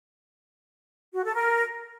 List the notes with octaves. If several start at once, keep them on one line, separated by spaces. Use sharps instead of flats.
F#4
A4
A#4